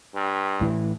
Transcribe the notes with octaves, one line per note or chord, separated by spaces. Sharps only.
G2
A2 E3